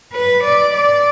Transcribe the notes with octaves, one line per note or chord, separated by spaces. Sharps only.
B4
D5
D5